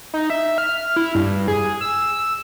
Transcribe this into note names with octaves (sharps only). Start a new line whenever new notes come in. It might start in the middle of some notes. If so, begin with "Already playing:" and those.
D#4
E5
F6
E4
G2
G#4
E6